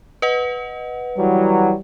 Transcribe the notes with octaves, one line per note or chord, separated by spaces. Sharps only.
B4 D#5 F#5
E3 F#3 G3